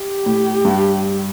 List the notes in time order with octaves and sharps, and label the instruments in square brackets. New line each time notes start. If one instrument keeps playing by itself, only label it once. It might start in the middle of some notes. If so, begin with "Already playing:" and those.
Already playing: [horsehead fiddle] G4
[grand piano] A2
G2